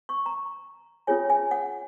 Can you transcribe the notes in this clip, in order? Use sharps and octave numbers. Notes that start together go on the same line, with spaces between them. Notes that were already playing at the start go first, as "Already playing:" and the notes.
C#6
A#5
C#4 F4 G#4 C#5 G#5
G#5
F#5